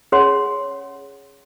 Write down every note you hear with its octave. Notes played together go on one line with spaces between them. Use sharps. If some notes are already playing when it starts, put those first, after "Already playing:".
C#4 G#4 C#5 F#5 C6